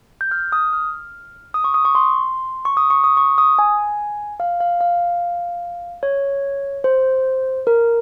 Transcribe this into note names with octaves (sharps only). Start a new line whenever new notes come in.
G6
F6
D#6
F6
D#6
C#6
D#6
C#6
C6
C#6
D#6
C#6
D#6
C#6
D#6
G#5
F5
F5
F5
C#5
C5
A#4